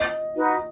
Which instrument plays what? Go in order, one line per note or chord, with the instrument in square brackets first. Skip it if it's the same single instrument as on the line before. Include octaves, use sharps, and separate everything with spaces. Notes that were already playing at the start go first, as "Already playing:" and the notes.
Already playing: [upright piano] D#5
[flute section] D#4 F#4 B4